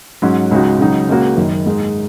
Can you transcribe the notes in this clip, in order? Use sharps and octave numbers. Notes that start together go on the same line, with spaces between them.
G#2 F#3 C#4
C#2 C#3 G#3 D#4 F#4
C#2 C#3 F#3 D#4
C#2 C#3 A#3 F#4
F#1 F#2 D#3
G#2 G#3 D#4